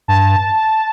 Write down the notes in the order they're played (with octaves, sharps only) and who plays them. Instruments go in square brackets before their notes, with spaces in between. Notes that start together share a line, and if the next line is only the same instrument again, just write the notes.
[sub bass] G2 [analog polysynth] A5